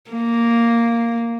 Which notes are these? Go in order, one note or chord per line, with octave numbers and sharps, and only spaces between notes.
A#3